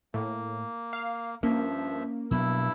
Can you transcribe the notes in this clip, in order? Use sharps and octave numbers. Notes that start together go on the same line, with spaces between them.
A2 A#3
F5
G2 F3 A#3 C#4 E5
G2 B2 F#3 B3 E4 E6